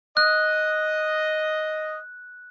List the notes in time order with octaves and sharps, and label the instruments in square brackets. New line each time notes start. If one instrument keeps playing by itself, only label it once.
[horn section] D#5 [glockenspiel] F#6